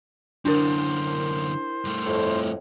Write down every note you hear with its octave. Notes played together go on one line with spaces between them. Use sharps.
F#2 D3 D4 E4 A#4 C5
G2 A3
F2 A2